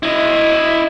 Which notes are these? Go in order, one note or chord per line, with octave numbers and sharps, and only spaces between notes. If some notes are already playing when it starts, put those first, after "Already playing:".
E4 D#5